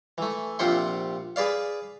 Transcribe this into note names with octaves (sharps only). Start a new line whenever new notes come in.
E3 A3
A#1 C3 F4 G4 F#5 C6
G#4 B4 D5 F5